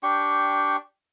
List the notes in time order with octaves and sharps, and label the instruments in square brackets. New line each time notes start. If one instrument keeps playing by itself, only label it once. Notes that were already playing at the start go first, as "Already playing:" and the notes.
[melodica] D4 G4 G5 C#6